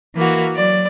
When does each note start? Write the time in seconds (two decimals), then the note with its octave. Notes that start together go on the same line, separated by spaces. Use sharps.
0.15 E3 A#3 F#4
0.56 F#3 D5